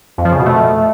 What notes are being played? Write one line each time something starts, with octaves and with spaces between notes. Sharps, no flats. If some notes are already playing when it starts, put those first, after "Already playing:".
F2
F3
C#3
B2
A3